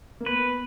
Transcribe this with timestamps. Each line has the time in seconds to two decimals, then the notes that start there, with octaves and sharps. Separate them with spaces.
0.21 A#3
0.26 B3 B4